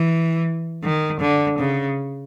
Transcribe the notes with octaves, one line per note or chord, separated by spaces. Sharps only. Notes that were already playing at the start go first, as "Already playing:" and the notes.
Already playing: E3
D#3
D3
C#3